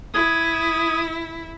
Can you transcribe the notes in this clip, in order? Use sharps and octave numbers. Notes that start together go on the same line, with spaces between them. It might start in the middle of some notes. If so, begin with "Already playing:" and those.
E4 D#6 G#6